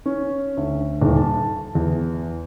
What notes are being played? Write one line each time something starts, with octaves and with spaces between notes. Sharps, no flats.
C#4
D2
D#1
A5
E2